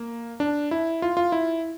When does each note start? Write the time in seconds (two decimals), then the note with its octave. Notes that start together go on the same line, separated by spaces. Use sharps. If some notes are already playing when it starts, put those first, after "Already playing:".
Already playing: A#3
0.40 D4
0.71 E4
1.02 F4
1.17 F4
1.32 E4